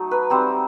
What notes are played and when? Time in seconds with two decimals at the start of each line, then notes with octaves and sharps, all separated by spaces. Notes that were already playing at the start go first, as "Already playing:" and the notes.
Already playing: F#3 A3 D#4
0.11 B4
0.30 G3 C4 D#4 C5